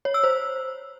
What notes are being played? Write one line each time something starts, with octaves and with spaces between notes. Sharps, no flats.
C#5
E6
C5